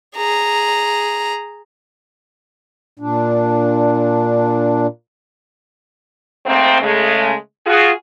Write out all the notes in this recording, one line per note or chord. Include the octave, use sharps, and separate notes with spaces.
G#4 A#5
A#2 D4
G#2 A3 A#3 C4
C#3 G#3 A3
F4 F#4 G#4